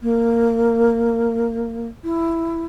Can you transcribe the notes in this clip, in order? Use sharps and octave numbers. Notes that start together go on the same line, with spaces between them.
A#3
E4